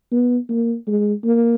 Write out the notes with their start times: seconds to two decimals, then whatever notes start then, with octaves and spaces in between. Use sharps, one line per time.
0.12 B3
0.49 A#3
0.87 G#3
1.25 A#3